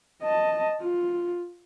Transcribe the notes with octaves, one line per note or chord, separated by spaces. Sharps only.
D#5 A5
F4